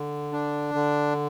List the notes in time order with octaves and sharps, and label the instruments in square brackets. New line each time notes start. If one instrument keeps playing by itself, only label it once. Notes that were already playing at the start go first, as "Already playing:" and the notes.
Already playing: [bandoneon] D3
D4
D3